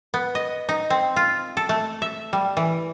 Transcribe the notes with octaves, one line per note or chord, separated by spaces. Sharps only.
B3
D#5
D#4
C4
F4
A4
A3
E5
G3
E3